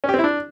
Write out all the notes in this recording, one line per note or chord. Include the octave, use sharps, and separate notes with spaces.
C#4
G4
C4
E4
D4